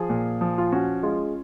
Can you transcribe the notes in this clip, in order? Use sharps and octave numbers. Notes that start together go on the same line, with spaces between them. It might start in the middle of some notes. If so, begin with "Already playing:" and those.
Already playing: F3 G#4
A#2
F3
F4
C#4 F#4
G#3 F4